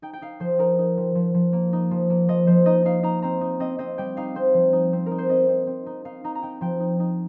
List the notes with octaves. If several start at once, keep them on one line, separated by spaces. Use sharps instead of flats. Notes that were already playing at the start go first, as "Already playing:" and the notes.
D#4 G5
G5
D#4 F5
F3 C5
D#4 A#4
D#4
F3
F3
F3
A#3
D#4
F3
A#3
F3 D#5
F3 C5
D#4 D#5
D#4 F5
D#4 A#5
C4 A#5
D#4
C4 D#5
C4 D#5
G3 G5
D#4 F5
C4 C5
F3
D#4
C4
D#4 A#4
C5
C4 D#5
C4
C4
D#4
D#4 F5
D#4 A#5
A#5
D#4 G5
F3 G5
D#4
D#4